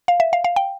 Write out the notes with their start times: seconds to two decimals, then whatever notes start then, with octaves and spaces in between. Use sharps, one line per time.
0.08 F5
0.20 E5
0.33 F5
0.44 F5
0.56 G5